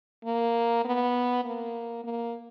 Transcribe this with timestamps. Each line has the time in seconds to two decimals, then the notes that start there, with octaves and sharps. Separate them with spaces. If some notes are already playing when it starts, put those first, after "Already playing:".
0.25 A#3
0.84 B3
1.45 A#3
2.04 A#3